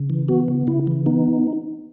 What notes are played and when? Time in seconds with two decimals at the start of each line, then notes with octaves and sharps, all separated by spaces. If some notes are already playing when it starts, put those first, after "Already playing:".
Already playing: C#3
0.10 E3
0.28 B3 F#4
0.48 C#3
0.67 C#3 E4
0.87 E3
1.06 B3 D#4